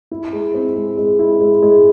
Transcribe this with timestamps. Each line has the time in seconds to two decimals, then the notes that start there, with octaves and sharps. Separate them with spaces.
0.11 E4
0.33 G#3
0.54 C4
0.76 G#3
0.97 G#3
1.19 E4
1.40 G#3
1.62 G#3